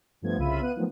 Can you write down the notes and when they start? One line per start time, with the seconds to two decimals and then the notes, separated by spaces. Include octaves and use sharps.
0.22 G2 F3 A3 B3 G#6
0.37 C2 C#3 F4 E5 B5 D#7
0.61 B3 F5 F#6 D#7
0.76 D#3 F3 F#3 A3 B3